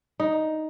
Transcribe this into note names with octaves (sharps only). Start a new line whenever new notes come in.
D#4